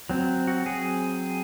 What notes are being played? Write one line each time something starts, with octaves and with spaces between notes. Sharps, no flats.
F#3 C4
F#4
G#4